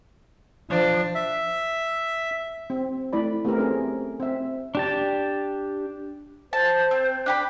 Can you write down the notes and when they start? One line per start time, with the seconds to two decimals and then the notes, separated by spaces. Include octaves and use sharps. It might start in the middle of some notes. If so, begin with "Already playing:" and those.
0.70 F3 D4
1.15 E5
2.70 C4
3.13 A3 E4 D5 B5
3.45 A3 B3 C4 G4 A4 A#4
3.59 C4 C#4 G#4
4.20 C4 E5
4.75 D4 G4 A5
6.53 C5 A5
6.91 C4
7.26 D4 G4 B5